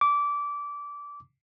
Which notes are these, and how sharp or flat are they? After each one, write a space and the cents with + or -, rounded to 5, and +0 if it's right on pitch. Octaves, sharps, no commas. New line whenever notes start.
D6 -20